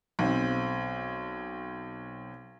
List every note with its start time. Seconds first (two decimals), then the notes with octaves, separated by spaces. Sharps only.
0.19 B1 C4